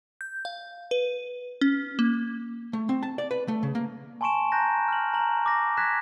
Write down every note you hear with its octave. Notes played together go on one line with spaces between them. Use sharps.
G6
F5
B4
C#4
A#3
A3
C4
A5
D5
B4
A3
C#3
A#3
G#5 A5 C6 C#6 D7 E7
A#5 F#6 G6 A#6
F6 F#7
A#5 F#7
D6 A#6
D6 F#6 G#6 A#6 B6 E7